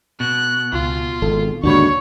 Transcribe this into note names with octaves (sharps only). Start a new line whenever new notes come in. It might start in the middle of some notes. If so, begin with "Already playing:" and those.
B2 F#6
C#2 F4
G#1 A4
D#2 G#2 D3 D4 F#4 C#5 B5 C#6